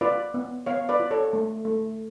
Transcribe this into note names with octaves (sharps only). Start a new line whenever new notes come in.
F4 B4 D5
B3
B3 C#5 F5
B4 D5
F4
A4 C#5
A3
A3